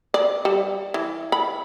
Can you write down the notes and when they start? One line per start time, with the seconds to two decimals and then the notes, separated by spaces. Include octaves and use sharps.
0.14 D5
0.45 G3
0.94 E3
1.32 B5